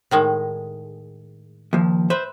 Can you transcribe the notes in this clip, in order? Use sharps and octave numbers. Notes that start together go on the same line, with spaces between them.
A2 D#3 G#3
D#2 F3
B4 C5 E5